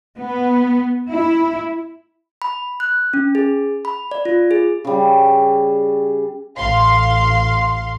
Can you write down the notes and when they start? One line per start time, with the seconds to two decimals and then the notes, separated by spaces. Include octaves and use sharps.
0.17 B3
1.08 E4
2.42 B5
2.80 F#6
3.14 C#4
3.35 G#4
3.85 B5
4.11 D5
4.25 F4
4.51 G#4
4.85 C#3 G3
6.57 A1 F5 C6